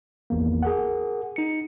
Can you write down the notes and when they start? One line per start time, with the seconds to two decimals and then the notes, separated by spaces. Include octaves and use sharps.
0.30 G#1 E2 A#3
0.63 G#4 A#4 F#5
1.36 D#4 C#7